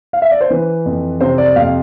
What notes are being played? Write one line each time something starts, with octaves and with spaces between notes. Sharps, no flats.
F5
E5
D5
C5
E3 B4
F2
C3 C5
D5
F2 F5